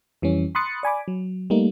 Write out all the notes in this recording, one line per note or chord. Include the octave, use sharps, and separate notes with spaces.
F2 E3 G3 C#4
B5 C6 D#6 F#6 A6 C#7
D5 G#5 B5 D6
F#3
G3 A3 A#3 D#4